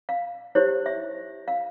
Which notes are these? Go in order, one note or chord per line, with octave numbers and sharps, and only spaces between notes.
F5
E4 G4 C5 C#5
E5
F5